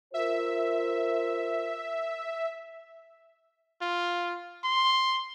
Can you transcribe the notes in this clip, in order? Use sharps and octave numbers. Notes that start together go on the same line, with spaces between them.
F4 A#4 C5 E5
F4
C6